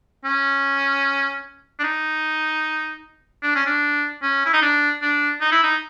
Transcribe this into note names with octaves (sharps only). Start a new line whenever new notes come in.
C#4
D4
D#4
D4
C#4
D4
C#4
E4
D#4
D4
D4
D#4
E4
D#4